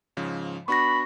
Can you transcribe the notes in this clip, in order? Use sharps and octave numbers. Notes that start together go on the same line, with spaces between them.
G#2 C#3 F3
B3 D4 F#4 B5 C#6 A#6